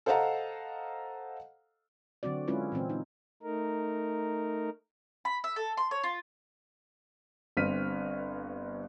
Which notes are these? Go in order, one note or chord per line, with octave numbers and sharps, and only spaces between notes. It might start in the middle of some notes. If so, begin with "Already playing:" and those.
A4 C5 D#5 F5 F#5 A#5
D3 F#3 C4 F#4 D5
G#3 C#4 E4 F4 B4
A#2 E3 C4
D#4
A3 D#4 A#4
B5
E5
A4
C6
C#5
F4
G1 G2 C4 F6 B6 D#7